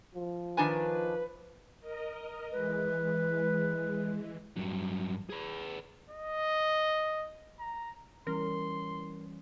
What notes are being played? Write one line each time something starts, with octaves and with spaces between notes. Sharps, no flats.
F3
D#3 D4 B4 G#5
A#4 D#5
E3 G#3 B4
G2 F#3
G#4 B4
D#5
A#5
E3 G3 C#4 A#4 C6